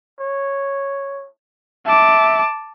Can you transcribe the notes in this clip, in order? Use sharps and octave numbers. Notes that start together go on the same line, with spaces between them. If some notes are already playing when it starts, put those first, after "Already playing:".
C#5
E5 A5 D6